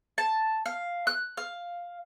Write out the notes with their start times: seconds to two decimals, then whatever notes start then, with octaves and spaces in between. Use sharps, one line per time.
0.18 A5
0.66 F5
1.07 F#6
1.37 F5